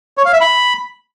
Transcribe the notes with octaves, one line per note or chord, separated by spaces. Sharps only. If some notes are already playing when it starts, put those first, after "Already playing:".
C#5
F5
E5
B5